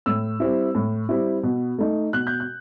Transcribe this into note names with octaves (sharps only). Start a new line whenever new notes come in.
A2 E6
G3 C4 E4
A2
G3 C4 E4
B2
A3 D#4
B2 F#6
G6
F#6